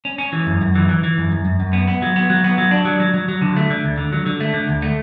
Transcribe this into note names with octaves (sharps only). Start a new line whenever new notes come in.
C#4
C#4
E3
F#2
F#2
E3
E3
E3
F#2
F#2
F#2
F#2
B3
B3
F#3
B3
F#3
B3
F#3
D4
F#3
F#3
F#3
F#3
D3
A3
D3
D2
D3
F#3
D3
A3
D3
D2
A3